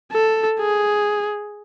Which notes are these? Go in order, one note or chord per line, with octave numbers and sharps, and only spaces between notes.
A4
G#4